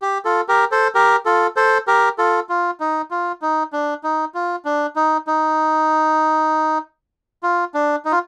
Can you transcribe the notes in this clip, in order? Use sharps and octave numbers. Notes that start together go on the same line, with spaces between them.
G4
F4 A4
G4 A#4
A4 C5
G4 A#4
F4 A4
A4 C5
G4 A#4
F4 A4
F4
D#4
F4
D#4
D4
D#4
F4
D4
D#4
D#4
F4
D4
D#4
F4